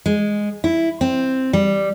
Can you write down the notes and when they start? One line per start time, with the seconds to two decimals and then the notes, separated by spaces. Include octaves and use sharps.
0.06 G#3
0.64 E4
1.01 C4
1.53 G3